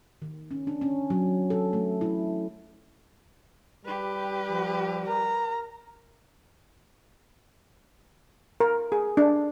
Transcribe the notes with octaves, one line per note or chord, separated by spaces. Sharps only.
D#3
C#4
D4
C#4
F#3
A4
A3
E4
G3 G4 B4
F3
A#4 A#5
A#4
G#4
D4